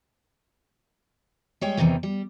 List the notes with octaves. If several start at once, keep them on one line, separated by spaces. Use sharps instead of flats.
G3 G#3 C#5 G5
E2 G#2 C3 D#3 E3
G3